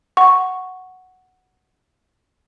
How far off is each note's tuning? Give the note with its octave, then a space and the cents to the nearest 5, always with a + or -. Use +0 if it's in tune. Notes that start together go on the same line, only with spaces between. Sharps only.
F#5 +0 C#6 +0